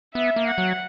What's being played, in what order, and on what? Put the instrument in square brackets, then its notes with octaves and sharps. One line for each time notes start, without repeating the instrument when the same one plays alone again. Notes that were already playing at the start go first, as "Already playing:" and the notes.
[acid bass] B3 [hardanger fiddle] E5
[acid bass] A#3
[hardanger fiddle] F#5
[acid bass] F#3